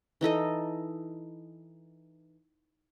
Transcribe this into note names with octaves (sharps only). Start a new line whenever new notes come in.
E3 D#4 A4 D#5